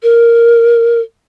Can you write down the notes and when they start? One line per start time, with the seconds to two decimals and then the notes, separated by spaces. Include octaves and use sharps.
0.03 A#4